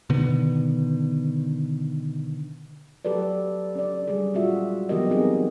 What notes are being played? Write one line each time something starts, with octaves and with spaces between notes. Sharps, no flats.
B2 D3 D#3 B3
F#3 G4 A4 B4 D5
C#4 D5
G3 G#4
A#2 G#3 C#4 F4 F#4 E5
E3 F#3 B3 G4 A#4 D#5
B3 C4 D#4 F#4 G#4 A#4